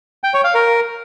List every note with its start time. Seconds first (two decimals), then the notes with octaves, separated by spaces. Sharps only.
0.24 G5
0.34 C#5
0.44 F5
0.54 A#4